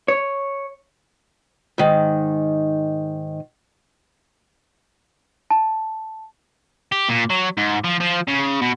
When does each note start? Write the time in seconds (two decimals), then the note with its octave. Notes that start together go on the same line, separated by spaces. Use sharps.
0.08 C#5
1.78 G#2 D#3
5.50 A5
6.92 G4
7.09 A#2
7.30 F#3
7.58 G#2
7.84 F3
8.00 F3
8.28 C#3
8.61 B2